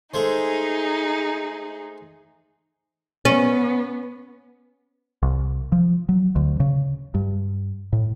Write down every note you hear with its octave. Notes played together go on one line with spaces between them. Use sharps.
G#3 A3 D#4 G#4 C5
B3 C#4
C2
F3
F#3
D2
C#3
G2
A2